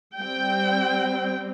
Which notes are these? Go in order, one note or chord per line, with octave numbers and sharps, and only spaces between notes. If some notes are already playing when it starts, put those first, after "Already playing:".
G3 C4 G5